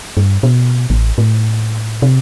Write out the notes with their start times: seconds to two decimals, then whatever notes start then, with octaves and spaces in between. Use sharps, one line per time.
0.17 G2
0.43 B2
0.90 A1
1.18 A2
2.02 C3